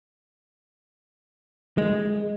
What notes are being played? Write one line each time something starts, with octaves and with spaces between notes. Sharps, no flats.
G#3